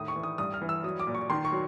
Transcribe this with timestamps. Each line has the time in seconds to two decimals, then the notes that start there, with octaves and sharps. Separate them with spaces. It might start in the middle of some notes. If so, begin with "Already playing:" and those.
Already playing: A2 D#3 D#6
0.08 C#6
0.16 E3
0.23 D#6
0.38 G2 D#6
0.54 F6
0.62 E3
0.69 E6
0.84 F#3 D#6
1.00 D6
1.07 A#2
1.15 C#6
1.30 D#3 C6
1.45 C#6
1.52 F#3